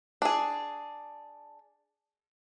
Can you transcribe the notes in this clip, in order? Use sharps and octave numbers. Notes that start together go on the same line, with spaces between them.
D4 G#4